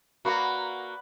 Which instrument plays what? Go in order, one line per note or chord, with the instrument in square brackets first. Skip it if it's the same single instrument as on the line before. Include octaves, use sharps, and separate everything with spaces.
[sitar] A#3 F#4 [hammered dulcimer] B4 D5 F#5